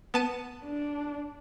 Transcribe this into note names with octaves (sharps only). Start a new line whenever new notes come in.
B3 A5 D#7
D4